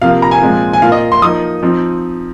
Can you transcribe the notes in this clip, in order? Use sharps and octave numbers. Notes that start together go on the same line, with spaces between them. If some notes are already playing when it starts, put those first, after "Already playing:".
C3 F3 A#3 F5
A#5
G#5
A#2 F3 G#3 C4 F4
G#5
A#2 A#3 F4 F5
D#5
C6
F3 A#3 D#4 D#6
F3 C4 D#4